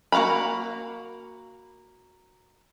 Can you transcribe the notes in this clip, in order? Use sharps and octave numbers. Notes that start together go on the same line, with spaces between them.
A#3 F#4 F5 A#5 B5